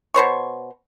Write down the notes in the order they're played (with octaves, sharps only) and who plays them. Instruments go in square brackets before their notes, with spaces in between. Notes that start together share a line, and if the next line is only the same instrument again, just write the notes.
[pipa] B2 C5 C#5 C#6